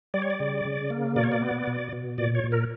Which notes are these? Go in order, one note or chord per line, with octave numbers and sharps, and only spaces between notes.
G3 D5
C#5
D5
C#3
C#3
A#3
B2 D5
C#5
D5
B3
B2
B2
A#2 D5
C#5
A#2
A#4